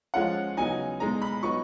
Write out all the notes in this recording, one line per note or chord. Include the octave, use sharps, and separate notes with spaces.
F3 G#3 C#4 F4 F#5
C#3 F#3 B3 D#4 G#5
B2 G#3 D#4 A#5
B5
F#3 B3 D#4 C#6